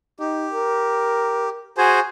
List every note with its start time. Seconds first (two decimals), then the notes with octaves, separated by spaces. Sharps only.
0.20 D#4 G4
0.53 A#4
1.78 F#4 G#4 C5 G#5